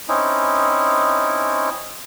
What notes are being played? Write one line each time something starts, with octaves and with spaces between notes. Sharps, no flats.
C4 C#4 D#4 E4